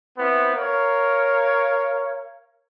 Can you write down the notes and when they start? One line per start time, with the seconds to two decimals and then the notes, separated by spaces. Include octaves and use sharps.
0.18 B3 C4 E4
0.55 A#4 C#5 F5